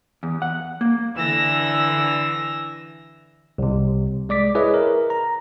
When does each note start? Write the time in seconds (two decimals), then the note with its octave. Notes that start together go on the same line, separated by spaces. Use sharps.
0.23 E2
0.42 F#5
0.81 A#3
1.15 D3 E3 E6 A#6
3.58 C2 C3
4.29 G#3 D5 D6 B6
4.55 E4 G#4 B4 C#5 D#5 E5
4.74 A#4
5.10 A#5